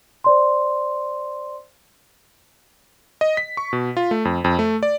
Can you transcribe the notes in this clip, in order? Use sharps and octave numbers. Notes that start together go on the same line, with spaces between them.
C5 D5 C6
D#5
B6
C#6
B2
F4
A3
F2
F2
A3
D5